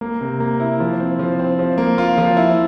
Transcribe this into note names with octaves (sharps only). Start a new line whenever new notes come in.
A#3
C3
A#3
E4
F3
C4
F3
C4
F3
A#3
F4
F3
E4